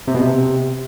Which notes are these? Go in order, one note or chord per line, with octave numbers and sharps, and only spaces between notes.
C3
B2
C3